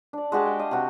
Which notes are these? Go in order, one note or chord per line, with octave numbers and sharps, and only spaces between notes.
D4 D5
G#3 F#4 G4 A5
G5
D#5 F5
C3 F#4